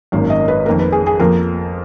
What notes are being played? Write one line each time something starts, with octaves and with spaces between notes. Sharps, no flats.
G#1 F#2 D#3 A#3
D#5
B4
F2 D#3 A#3 A#4
B4
G#4
G#4
F2 F3 A#3 A#4